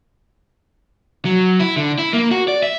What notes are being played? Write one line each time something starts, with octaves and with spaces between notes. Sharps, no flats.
F#3
E4
D3
E4
A#3
F#4
D5
E5